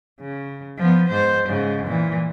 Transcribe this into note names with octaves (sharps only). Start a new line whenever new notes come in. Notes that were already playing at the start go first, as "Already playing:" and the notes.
C#3
F3 B3
G#2 C5
G#2 C#3
A#2 E3